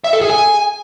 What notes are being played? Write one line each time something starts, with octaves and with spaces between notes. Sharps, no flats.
E5
A4
G#4
G#5